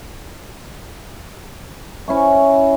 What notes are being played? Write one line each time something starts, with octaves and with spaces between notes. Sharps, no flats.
C#4 E4 C#6